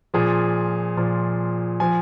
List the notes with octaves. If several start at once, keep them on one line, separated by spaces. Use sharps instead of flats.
A#2 F3 G#4
A#2 F3
F3 G#5